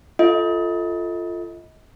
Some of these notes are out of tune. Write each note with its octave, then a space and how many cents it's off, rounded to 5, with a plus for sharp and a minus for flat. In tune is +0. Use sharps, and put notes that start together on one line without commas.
F4 -5 A4 +0 D#5 +30